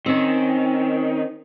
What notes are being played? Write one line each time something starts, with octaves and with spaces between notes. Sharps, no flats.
D#3 C4 C#4